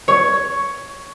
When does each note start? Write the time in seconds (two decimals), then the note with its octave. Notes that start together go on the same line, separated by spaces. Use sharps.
0.08 C#5